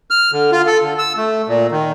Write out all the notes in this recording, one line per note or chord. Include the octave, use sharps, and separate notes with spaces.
F6
D3
F4
A4
D3
E6
A3
A#2
D#3